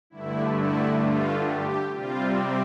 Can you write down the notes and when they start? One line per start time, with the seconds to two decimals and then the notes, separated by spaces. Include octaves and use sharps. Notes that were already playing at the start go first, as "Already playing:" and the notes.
0.10 G2 D3 A3 E4
0.55 E4
1.00 F4
1.46 G4
1.91 C3 G3 C4 F4